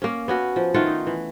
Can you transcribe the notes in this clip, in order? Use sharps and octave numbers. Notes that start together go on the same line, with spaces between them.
A#3 C#4
B3 C#4 F#4
F3
D#3 A3 F4 F#5
D#4
E3